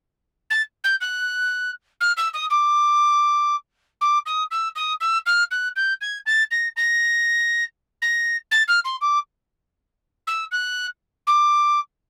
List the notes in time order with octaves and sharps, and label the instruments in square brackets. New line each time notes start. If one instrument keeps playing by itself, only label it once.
[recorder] A6
G6
F#6
F6
E6
D#6
D6
D6
D#6
E6
D#6
E6
F6
F#6
G6
G#6
A6
A#6
A#6
A#6
A6
F6
C6
D6
E6
F#6
D6